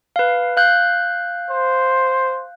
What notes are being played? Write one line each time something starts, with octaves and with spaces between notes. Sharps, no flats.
B4 F5
F5 F#6 G6
C5